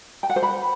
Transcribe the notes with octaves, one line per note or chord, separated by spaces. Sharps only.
G5
F#5
C5
B5